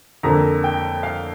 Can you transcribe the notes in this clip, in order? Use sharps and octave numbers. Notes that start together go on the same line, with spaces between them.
F2 D3 A#3 A#5
G5
F5